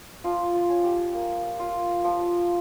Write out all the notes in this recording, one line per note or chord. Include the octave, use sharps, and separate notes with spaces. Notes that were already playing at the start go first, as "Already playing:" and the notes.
F3 F4
F4
C#4
G4
A#3
F4
F3